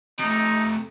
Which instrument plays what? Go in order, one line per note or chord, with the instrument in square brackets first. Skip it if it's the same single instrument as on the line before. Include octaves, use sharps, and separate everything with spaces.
[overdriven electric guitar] C3 A3 [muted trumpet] D#4